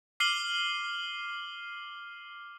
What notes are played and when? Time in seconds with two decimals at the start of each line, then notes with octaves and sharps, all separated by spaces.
0.20 D6 F6 C7 D#7 F#7 G7